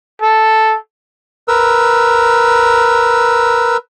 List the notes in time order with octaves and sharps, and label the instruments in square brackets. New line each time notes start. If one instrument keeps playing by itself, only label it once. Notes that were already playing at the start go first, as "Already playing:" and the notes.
[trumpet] A4
[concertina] A#4 B4 E6